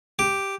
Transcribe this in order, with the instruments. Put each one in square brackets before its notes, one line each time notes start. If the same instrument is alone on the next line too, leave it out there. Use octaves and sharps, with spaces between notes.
[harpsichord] G4